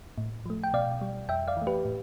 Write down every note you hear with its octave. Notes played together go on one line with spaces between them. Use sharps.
A2
F3 A3
G5
B2 D5 F5
G3
F2 E5 G5
D5 F5
E3 A3
G4 B4
A2